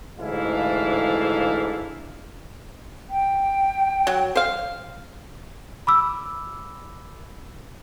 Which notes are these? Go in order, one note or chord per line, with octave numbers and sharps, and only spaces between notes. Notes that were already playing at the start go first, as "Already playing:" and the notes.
A1 D2 G#2 D4 E4 F5
G5
F#3
C5 F5
B5 D6 E6